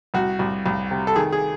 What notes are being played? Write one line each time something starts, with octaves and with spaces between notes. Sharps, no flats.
C2 F#4
C2
C2
C3
A4
D#3 G#4
G#4